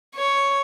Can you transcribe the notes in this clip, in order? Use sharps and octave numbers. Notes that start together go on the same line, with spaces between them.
C#5